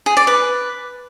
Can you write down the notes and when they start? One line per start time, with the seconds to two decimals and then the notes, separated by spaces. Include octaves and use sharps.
0.06 G#4
0.17 D5
0.27 B4